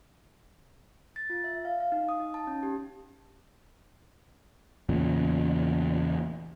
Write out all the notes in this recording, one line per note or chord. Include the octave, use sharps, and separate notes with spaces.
A6
F4
E5
F5
F5
D#4
D#6
D#4
A5
C#4
G4
E2 A#2 C#3